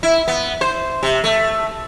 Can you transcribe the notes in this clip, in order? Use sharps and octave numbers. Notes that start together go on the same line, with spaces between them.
E4
B3
C5
C3
A3